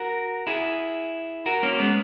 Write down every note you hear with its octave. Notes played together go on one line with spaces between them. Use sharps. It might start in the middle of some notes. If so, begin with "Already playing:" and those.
Already playing: F#4 A#4
E4 G#4
F#4 A#4
A#3 C#4
G#3 B3